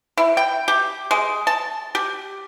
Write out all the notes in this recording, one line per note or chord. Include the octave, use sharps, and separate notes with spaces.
E4
G5
G4
G#3
A5
G4